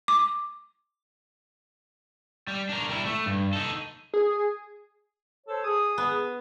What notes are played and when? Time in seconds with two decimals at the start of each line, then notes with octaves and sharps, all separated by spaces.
0.08 D6
2.48 G3
2.69 D4 A#4
2.89 G3 E4
3.05 A3
3.26 G2
3.53 D#4 A4
4.14 G#4
5.47 A4 C5 C#5
5.64 G#4 D#6
5.98 B3